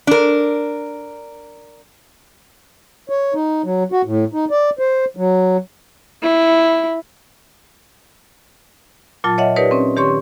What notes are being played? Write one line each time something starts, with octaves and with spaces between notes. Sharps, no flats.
D4 A#4
C#5
D#4
F#3
F#4
A2
D#4
D5
C5
F#3
E4
A#2 F#3 F4 A5 A6
C#5 D#5 E5 F#5
D#4 G4 A#4 B4 C#5 D5
C4 C#4
D#3 G4 C#5 C6 C#6